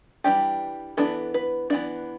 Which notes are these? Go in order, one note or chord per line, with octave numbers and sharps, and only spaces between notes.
E3 G3 D4 G4
E3 B3 D4 A4
B4
E3 B3 D4 D5